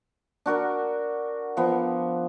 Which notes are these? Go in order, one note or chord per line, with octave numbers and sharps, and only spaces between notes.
D4 F#4 A#4 F#5
F3 B3